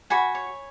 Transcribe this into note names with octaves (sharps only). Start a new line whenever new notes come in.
F#4 G#5 B5
C#5